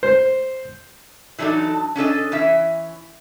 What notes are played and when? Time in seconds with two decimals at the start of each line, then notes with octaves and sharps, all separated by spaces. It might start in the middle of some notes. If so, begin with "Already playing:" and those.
0.03 C5
1.38 E3 F#3 D4 D#4 A4
1.96 C#4 D4 A4 D#5
2.32 E3 C#4 E5